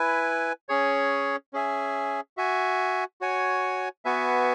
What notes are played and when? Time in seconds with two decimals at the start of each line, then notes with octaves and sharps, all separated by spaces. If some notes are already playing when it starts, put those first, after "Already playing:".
Already playing: E4 B4 G#5
0.69 C#4 G#4 C#5
1.53 C#4 G#4 E5 G#5
2.37 F#4 E5 G#5
3.21 F#4 C#5 G#5
4.05 B3 F#4 B4 E5 G#5